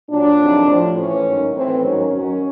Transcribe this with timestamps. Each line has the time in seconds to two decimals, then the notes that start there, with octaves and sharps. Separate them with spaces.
0.10 A#2 F#3 D4
0.39 F2 C3 D#3 F#3
0.67 A2 F3
0.96 A2 E3 C#4
1.25 G#2 D#3 F#3
1.54 A2 E3 C4
1.83 G#2 D#3 F#3 C#4
2.12 F#2 D#3 F#3 C#4